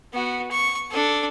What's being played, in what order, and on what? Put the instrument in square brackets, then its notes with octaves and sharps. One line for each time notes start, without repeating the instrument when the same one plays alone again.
[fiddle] B3 F#4
C#6
D4 A4